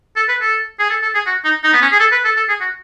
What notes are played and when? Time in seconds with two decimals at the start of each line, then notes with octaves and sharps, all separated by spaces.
0.16 A4
0.28 B4
0.41 A4
0.79 G#4
0.90 A4
1.02 A4
1.14 G#4
1.26 F#4
1.45 D#4
1.64 D#4
1.73 B3
1.82 C#4
1.92 G#4
2.00 A4
2.12 B4
2.24 A4
2.36 A4
2.49 G#4
2.61 F#4